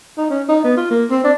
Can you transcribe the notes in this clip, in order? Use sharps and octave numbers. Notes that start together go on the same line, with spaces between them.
D#4
C#4
D#4
B3
F4
A#3
C4
D4